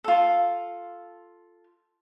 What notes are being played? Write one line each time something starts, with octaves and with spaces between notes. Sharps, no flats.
F4 A4